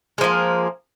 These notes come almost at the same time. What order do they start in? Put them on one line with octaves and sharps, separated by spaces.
G#3 F3 A#3